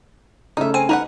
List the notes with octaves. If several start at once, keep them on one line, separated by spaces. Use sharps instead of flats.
C#3 A3 D#4 E5
C4 G#5
D#4 A#4 B4 F#5